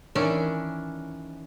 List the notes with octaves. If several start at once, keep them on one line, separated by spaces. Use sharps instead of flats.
D#3 E3 C#4 D4